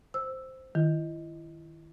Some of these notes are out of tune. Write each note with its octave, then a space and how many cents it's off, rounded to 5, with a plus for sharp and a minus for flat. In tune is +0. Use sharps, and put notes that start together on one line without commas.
C5 +0 E6 +0
D#3 +0 E4 +25